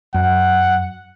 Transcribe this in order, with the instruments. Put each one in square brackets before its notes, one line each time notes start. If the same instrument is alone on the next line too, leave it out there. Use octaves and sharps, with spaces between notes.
[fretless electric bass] F#2 [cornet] F#5